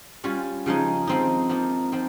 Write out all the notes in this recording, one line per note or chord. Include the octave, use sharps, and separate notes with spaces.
G3 C#4 F4
C#3 F3 G#3 D#4
F3 C4 D#4
F3 A#3 D#4
F3 C4 D#4